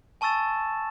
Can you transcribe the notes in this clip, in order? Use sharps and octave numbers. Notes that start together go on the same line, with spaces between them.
G#5 A5 C#6 E6 A6 E7